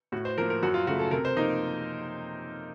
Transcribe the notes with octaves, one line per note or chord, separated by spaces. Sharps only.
A2 F#4
C5
F3 A#3 A#4
A#4
F#2 F#4
F4
C#3 A3 F#4
A4
C3 A#4
C5
F3 A#3 D#4